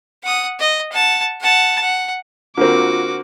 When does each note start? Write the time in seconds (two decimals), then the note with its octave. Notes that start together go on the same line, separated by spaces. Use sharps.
0.23 F#5 D#6
0.59 D#5
0.92 F#5 A5
1.41 F#5 A5
1.81 F#5
2.58 D3 A#3 C4 F4 F#4 A#4 D6